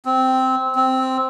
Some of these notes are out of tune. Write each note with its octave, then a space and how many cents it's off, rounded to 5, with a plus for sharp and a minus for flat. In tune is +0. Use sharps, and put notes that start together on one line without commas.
C4 -10
C4 -5